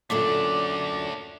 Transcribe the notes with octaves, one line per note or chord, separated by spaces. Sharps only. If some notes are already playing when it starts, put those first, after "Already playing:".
F#2 A#2 D3 A3 D4 D6